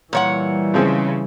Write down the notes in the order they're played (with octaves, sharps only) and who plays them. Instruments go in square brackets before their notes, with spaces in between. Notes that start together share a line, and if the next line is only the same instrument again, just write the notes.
[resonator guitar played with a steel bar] A#2 C#5 F#5 [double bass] E3 G3
[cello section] C#3 [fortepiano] F3 G#3 C4